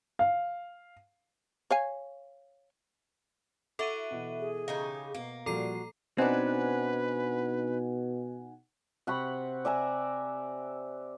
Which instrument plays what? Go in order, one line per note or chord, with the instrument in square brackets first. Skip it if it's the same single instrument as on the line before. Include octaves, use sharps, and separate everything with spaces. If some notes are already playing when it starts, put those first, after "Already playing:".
[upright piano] F5
[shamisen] C#5 F5 G#5
[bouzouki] E4 F#4 [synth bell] A4 E5 D#7
[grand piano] B2 E3
[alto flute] G#4
[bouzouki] C#3 D#4 G4 [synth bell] F5
[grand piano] B2 [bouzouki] A#3
[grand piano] A#2 F3 G3 [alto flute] F#4 [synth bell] A4 A#5 C7
[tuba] B2 [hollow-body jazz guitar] C4 D4 [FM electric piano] D#4 F#5 G#5 [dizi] B4
[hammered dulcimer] C3 F#5 B5 C#6
D5 E5 G#5 A#5